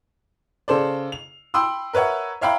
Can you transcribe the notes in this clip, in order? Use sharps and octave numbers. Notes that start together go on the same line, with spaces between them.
C#3 A4 C5 D5
F7
G5 B5 C6 D#6 E6
A#4 B4 C#5 E5 F#5
C#5 E5 F5 G5 A#5 B5